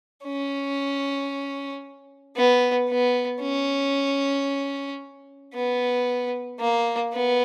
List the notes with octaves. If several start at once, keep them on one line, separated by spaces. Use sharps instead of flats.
C#4
B3
B3
C#4
B3
A#3
B3